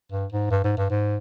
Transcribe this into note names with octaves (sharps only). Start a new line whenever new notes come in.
G2
G#2
G2
G#2
G2
G#2